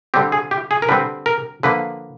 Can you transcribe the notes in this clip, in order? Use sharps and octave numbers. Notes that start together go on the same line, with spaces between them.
D3 G3 C4 G4
G#4
G4
G#4
A#4
D3 G3 C4 B4
A#4
D3 F3 A#3 B4